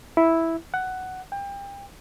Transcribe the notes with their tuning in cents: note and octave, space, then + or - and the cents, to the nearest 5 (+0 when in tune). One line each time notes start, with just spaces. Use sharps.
E4 -5
F#5 +10
G5 +30